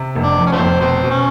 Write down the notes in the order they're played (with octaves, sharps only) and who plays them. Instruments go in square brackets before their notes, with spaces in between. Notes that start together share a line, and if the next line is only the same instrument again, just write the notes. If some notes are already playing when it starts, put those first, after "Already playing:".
Already playing: [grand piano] C3
F1
[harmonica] D4
[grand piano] F2
[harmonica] C#4
F3 A3 C4
[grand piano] F1
[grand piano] B2 [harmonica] C4
[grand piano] B2
[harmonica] C#4